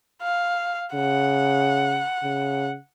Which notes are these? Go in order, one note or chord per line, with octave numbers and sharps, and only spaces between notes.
F5
C#3 F#5
C#3